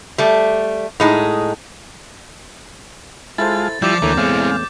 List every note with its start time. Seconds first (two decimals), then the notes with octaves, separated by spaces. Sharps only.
0.18 G3 A3
1.00 A2 G#3 D#4
3.38 G#3 E4 F4 A4 C5 A5 A6
3.82 F3 G3 E4 D5 D6 G6
4.02 D2 E3 A3 A#3 C#5
4.17 E2 A2 G#3 C4 E4 F5